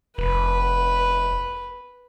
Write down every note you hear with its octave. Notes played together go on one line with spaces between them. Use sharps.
F1 B4